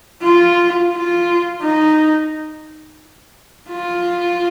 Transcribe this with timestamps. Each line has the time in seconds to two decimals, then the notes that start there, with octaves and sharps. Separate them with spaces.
0.23 F4
0.93 F4
1.62 D#4
3.70 F4